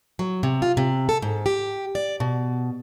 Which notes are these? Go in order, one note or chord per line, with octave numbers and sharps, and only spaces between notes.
F#3
C3
F4
C3
A4
G#2
G4
D5
B2